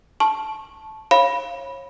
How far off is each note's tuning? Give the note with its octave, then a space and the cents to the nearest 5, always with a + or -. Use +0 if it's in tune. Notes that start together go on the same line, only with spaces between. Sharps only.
A5 -10 C#6 -20
C#5 -30 F5 -5 B5 -10